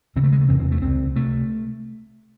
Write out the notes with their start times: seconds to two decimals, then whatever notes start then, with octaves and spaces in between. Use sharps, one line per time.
0.16 D#2 C#3 C4
0.23 A3
0.32 G#3
0.41 A3
0.49 E2 C3 C4
0.60 C4
0.71 A3
0.82 C#2 C3 C4
1.16 C3 A3